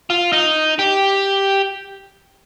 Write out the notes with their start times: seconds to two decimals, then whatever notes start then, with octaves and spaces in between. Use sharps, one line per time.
0.10 F4
0.33 D#4
0.79 G4